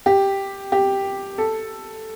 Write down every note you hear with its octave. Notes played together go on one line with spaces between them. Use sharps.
G4
G4
A4